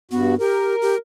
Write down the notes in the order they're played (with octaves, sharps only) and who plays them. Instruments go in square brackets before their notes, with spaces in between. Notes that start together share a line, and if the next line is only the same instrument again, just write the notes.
[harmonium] G2 F#4 [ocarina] B3
[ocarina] G4 [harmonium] A#4
[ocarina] G4